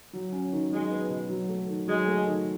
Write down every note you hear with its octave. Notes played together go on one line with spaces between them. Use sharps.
F#3
C#4
D#3
F#3 G#3
B3
B2
F#3
A3
D#3
F#3 G#3
A3
D#3